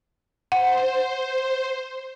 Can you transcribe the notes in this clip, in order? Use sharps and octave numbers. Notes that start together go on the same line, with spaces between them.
C5 F#5